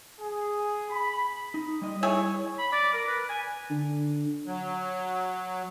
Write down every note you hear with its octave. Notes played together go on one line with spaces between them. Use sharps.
G#4
B5
D#4
G3 D#5
E4 G#4 C#5 G#5
B5
D5
A#4
B4
G#5
D3
F#3